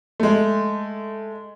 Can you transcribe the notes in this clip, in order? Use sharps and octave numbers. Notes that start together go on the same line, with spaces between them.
G#3 A3